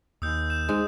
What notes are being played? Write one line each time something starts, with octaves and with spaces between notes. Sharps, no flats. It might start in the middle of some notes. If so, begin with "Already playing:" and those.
D#2 D#6 E6 G6
G6 E7
G#2 G#3